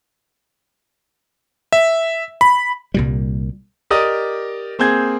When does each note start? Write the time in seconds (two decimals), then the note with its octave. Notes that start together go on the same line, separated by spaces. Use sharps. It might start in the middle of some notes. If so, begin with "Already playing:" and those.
1.73 E5
2.41 B5
2.94 C2 A#2 G3
3.90 G4 A#4 D5 D#5 D#6
4.79 A#3 C4 G#4 G6 G#6